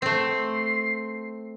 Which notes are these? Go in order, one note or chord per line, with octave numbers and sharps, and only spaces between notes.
A3 C4 C6